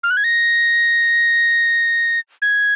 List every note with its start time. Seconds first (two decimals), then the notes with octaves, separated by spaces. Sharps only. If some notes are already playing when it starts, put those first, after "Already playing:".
0.03 F6
0.10 F#6
0.17 G#6
0.24 A#6
2.42 G#6